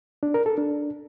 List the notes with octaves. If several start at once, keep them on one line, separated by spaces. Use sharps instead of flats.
D4
A#4
A4
D4